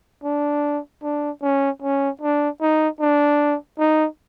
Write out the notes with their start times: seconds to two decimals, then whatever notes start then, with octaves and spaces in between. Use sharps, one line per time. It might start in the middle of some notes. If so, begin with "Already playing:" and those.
0.24 D4
1.03 D4
1.42 C#4
1.82 C#4
2.21 D4
2.61 D#4
3.00 D4
3.79 D#4